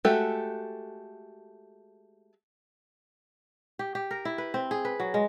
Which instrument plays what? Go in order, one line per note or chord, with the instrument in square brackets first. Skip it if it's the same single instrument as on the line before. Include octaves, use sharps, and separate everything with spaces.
[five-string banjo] G#3 A3 F#4 G4 A4
[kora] G4
G4
A#4
E4
B4
C4
G#4
B4
F#3
G#3